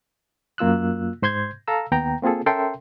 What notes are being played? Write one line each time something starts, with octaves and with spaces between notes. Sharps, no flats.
F#2 A#3 F4 E6 F#6
G#2 C5 C6 G6 G#6
A4 F5 A#5 E6
D#2 B3 G5 A#5
A#3 C4 F4 G#4 A4
C#4 A4 A#4 E5 G5 C6